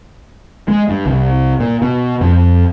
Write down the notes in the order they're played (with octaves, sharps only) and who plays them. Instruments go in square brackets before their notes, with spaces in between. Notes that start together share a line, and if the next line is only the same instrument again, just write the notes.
[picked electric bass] G#3
G2
C2
A#2
B2
F2